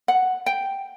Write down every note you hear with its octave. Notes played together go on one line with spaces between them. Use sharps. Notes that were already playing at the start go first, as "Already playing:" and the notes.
F#5
G5